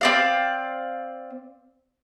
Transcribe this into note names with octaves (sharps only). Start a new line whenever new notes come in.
C4 D5 F5